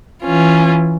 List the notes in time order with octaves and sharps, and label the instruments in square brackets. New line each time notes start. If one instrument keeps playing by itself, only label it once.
[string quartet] E3 C#4 F4